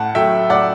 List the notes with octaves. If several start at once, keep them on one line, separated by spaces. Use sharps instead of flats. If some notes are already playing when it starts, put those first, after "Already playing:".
Already playing: A2 F#5 A5
F#3 A3 E5 G5
A2 D5 F#5